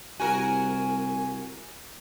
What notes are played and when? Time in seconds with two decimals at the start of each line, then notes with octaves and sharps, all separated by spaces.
0.20 C2 F#4 A#4 G#5